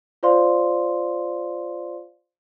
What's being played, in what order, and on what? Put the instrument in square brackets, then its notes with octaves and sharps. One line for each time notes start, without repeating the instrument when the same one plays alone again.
[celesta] F4 C5 D5 F5 C6